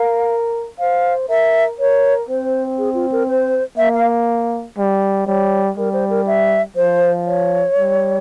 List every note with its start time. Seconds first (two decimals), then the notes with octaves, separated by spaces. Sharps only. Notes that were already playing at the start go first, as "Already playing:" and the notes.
Already playing: A#4 F5
0.79 C5 F5
1.29 A#4 E5
1.79 A#4 C#5
2.29 C4 C5
2.78 G#4
2.94 F4
3.12 A#4
3.28 C5
3.77 A#3 E5
3.94 F5
4.78 G3
5.27 G3 C#5
5.77 G3 A#4
5.93 C5
6.10 A#4
6.27 E5
6.76 F3 C5
7.26 C#5
7.77 G3